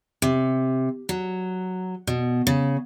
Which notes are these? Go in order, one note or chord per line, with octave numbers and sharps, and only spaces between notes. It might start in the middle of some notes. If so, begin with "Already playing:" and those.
C3
F#3
B2
C#3